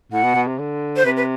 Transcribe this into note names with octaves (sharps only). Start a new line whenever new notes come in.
A2 F#5
B2
B2
C3
D3
C5
C3 B4
B4